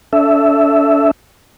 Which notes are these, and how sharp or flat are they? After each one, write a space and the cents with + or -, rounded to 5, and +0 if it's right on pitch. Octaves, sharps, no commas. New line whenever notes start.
D4 -40 A4 -10 E5 +0